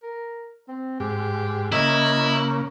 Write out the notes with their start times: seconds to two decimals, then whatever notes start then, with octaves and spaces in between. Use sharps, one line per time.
0.03 A#4
0.68 C4
1.00 G#2 G4
1.72 C#3 A#3 E4 D#5